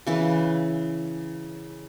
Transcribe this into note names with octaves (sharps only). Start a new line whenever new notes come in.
C#3 E3 B4